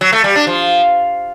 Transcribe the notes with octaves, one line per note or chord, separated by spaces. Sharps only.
F#3
A3
G3
D4
F3